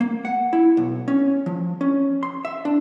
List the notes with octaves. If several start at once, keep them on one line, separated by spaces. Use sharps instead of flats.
A#3
F#5
E4
B1
C#4
F3
C#4
C6
E5
D4